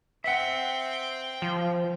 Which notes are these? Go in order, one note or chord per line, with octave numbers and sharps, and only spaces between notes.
C4 E5 F#5 G5
F3